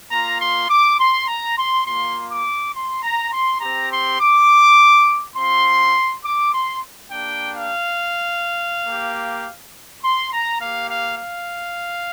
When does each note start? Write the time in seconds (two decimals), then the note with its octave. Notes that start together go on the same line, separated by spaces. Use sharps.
0.11 A#3 F4 A#5
0.40 C6
0.69 D6
0.98 C6
1.28 A#5
1.57 C6
1.85 A#3 F4 C6
2.30 D6
2.74 C6
3.03 A#5
3.32 C6
3.60 C4 G4 A#5
3.91 C6
4.19 D6
5.36 C4 F4 C6
6.24 D6
6.53 C6
7.10 A#3 D4 G4 G5
7.55 F5
8.85 A#3 G4
10.02 C6
10.32 A#5
10.60 A#3 G4 F5
10.90 F5
11.18 F5